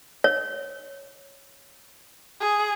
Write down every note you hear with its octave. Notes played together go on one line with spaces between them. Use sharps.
C#5
G#4